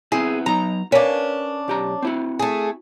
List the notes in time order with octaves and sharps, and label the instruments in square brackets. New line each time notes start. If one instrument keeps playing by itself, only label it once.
[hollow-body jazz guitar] B3 C4 E4 [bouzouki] G#4
[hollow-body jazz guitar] F#3 B3 D#4 [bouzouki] A#5
[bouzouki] C#4 D4 [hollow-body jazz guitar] A#4 B4 F5
[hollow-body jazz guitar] B1 G4 A#5
C4 E4 F#4
[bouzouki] A3 G#4